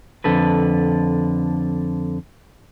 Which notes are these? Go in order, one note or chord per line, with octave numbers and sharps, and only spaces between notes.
F2 D3 A4 B4